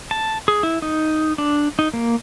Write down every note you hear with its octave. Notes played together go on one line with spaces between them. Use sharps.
A5
G#4
E4
D#4
D4
D#4
A#3